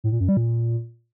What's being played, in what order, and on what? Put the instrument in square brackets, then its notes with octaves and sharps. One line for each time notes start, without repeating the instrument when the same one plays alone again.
[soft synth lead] A2
A#2
F#2
G3
A#2